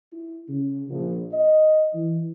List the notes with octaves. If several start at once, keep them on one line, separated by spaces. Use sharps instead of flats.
E4
C#3
A#1
D#5
E3